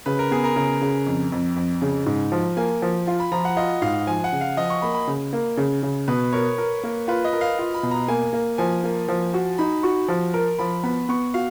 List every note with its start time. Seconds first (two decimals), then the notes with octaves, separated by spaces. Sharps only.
0.06 C#3 B4
0.19 A#4
0.31 B3 G#4
0.44 A#4
0.56 C#3 A#4
0.81 C#3
1.06 F2
1.32 F2
1.56 F2
1.82 C#3
2.06 G#2
2.32 F3
2.57 A#3 G#5
2.82 F3
3.07 F4
3.20 B5
3.32 F3 A#5
3.45 F#5
3.57 F4 D#5
3.82 G#2 F5
4.07 F3 G#5
4.24 F#5
4.32 C#3
4.41 F5
4.57 F3 D#5
4.70 C#6
4.82 A#3 B5
4.95 B5
5.07 C#3
5.33 A#3
5.57 C#3
5.83 C#3
6.08 B2 B4
6.33 A#4 C#5
6.58 A#4
6.83 A#3
7.08 F4 B4
7.24 D#5
7.33 A#4
7.41 F5
7.59 F4
7.74 B5
7.83 B2
7.91 A#5
8.08 A#3 G#5
8.33 A#3
8.58 F3 G#5
8.84 A#3
9.08 F3
9.34 F#4
9.58 D#4 B5
9.83 F#4 C#6
10.08 F3
10.34 A#4
10.59 F3 B5
10.84 B3 B5
11.09 B3 C#6
11.34 F#4 F5